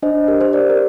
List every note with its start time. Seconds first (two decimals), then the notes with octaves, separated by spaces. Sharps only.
0.03 D4 C5 D#5
0.28 G4 A#4
0.41 C5
0.53 G4 A#4 D5
0.69 A#4